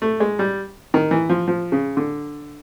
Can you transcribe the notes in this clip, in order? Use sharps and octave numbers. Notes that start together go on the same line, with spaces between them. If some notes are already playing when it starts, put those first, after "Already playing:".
A3
G#3
G3
D#3
E3
F3
F3
C#3
D3